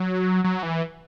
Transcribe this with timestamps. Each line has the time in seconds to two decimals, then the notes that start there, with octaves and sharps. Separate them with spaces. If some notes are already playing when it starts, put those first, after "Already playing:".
Already playing: F#3
0.44 F#3
0.63 E3